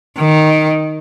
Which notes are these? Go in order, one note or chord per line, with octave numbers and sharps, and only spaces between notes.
D#3